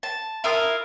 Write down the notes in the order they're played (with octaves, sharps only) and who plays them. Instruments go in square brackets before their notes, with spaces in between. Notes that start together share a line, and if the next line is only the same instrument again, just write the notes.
[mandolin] A5
E4 F4 A#4 D#6